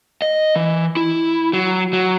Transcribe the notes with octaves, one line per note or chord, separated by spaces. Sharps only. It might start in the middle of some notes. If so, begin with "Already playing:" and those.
D#5
E3
E4
F#3
F#3